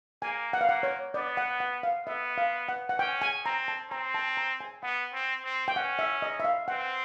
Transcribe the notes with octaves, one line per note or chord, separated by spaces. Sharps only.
A#3 G#5
F#5
F5
A#3 F#5
C#5
B3 D5
F#5
F#5
F5
B3 E5
F5
F#5
F#5
C#4 G5
G#5
C4 A#5
A5
C4 A#5
A5
A#5
G#5
B3 F#5
C4
C4
G5
C#4 F#5
E5
D#5
E5
F5
C4 F#5